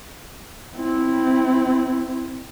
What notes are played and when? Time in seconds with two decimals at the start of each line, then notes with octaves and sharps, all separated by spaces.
0.77 C4 E4